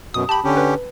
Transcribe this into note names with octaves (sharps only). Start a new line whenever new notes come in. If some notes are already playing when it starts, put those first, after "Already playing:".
F#2 B2 D#6
G4 A5 B5
D3 C#4 G4
B4